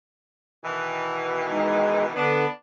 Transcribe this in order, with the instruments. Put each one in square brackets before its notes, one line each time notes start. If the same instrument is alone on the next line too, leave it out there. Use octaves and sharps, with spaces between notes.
[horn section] B2 D#3 E3
[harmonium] G#3 D#4
[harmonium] D3 B4 [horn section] B3 D4